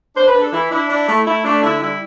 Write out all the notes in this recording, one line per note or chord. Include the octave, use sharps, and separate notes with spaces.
D4 C5
B4
D4
A4
E3 E4
D4 E4
D4
A3
A3 E4
A3 D4
D3 E4
G3 E4